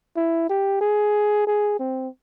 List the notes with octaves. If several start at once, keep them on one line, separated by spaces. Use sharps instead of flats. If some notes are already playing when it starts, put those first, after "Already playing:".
E4
G4
G#4
G#4
C4